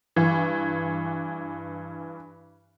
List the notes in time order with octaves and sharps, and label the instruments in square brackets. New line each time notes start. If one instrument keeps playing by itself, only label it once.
[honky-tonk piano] G2 E3